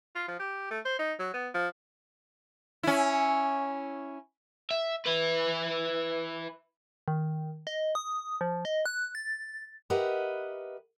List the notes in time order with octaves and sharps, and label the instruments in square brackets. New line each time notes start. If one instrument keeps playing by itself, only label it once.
[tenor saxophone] F4
F3
G4
A3
C5
D#4
F#3
B3
F3
[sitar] C#4 E4
[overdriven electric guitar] E5
E4 B4
[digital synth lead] D#3
D#5
D#6
F3
D#5
F#6
A6
[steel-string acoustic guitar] G4 A#4 B4 D#5 E5 F#5